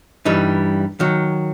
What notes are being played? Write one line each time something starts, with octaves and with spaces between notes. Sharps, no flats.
G2 E3 G3 D#4
D#3 F#3